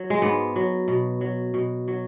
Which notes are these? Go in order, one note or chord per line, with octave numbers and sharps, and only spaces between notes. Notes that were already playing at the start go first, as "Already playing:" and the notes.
Already playing: F#3
G#3
G#2 B3
F#3
B2
F#3
B2
F#3